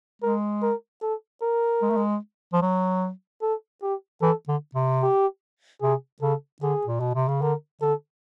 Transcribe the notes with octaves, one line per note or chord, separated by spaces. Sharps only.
G#3 A#4
A#4
A4
A#4
G#3
A3
G#3
F3
F#3
A4
G4
E3 A4
D3
C3
G4
C3 G#4
C#3 A4
D3 G#4
A#2
B2
C3
C#3
D3 A#4
D3 A4